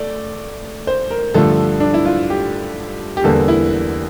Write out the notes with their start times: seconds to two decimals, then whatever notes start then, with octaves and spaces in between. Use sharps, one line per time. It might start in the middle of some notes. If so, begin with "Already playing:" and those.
Already playing: A3 D5
0.87 C5
1.11 A#4
1.34 G2 D3 F3 A3 A4
1.80 D4
1.94 E4
2.06 F4
2.30 G4
3.17 G4
3.24 E2 D3 G3 A#3 A4
3.48 E4